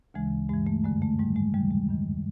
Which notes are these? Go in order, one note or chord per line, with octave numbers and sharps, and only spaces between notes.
D2 C#3 E3 G#3
G2 E3 G#3
A3
F#2 D3 G#3
A3
G#2 D#3 G3
G#3
D#2 C#3 E3 G3
G#3
F#2 D#3